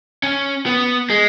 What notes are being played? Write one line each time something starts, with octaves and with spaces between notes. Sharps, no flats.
C#4
B3
G#3